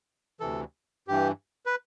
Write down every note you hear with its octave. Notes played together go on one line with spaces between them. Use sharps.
D2 C3 E3 A4
G2 E3 G4
B4